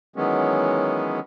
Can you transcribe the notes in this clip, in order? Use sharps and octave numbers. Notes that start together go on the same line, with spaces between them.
D#3 E3 F#3 G#3 B3 C#4